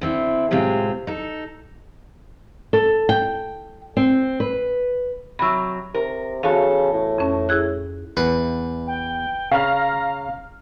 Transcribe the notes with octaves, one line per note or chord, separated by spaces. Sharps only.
D3 C4 E4
A2 C3 G#3 C4 F4
D#4 A4
A4
G5
C4
B4
C3 F#3 B5 E6
C3 A#4
E2 C#3 F#4 A4 F5
A2
F2 C#4
E4 G#4 F#6
E2 B4
G5
C#3 F5 A#5 F6